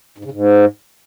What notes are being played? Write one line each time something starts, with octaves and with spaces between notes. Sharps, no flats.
G#2
C#3
G#2